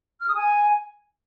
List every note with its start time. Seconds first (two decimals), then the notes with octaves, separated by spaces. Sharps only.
0.20 F6
0.27 D#6
0.34 G#5